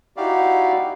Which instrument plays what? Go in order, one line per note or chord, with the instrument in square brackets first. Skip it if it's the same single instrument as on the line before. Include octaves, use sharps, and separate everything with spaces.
[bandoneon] D#4 E4 F#4 G4 D5 F5